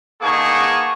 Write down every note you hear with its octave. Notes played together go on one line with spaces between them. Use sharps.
A#3 B3 D#4 G#4 A5 C#6